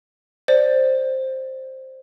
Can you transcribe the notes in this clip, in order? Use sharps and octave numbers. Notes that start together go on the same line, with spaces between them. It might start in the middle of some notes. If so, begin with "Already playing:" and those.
C5 D5